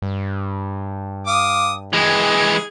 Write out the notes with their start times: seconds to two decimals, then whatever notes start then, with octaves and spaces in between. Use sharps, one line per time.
0.02 G2
1.27 F5 D6 D#6
1.93 E3 G#3 G#4